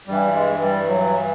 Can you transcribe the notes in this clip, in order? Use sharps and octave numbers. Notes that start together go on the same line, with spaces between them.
G2 E3 G3
G#3
G3
F#3